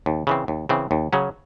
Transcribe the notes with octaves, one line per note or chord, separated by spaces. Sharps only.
D#2
C#3 E3 C4
D#2
C#3 E3 C4
D#2
C#3 F#3 C#4